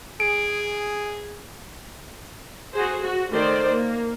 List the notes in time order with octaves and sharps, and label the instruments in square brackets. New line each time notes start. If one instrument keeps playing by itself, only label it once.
[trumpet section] G#4 [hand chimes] D7
[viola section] F#4 G#4 C5
F#4
D#3 A3 C5 D5
A#3